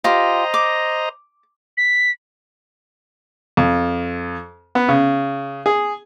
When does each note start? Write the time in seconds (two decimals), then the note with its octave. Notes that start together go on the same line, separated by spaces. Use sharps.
0.04 F4 G4 C5 D#5 A#5 C6
0.54 D6
1.77 B6
3.57 F2
4.75 B3
4.89 C#3
5.66 G#4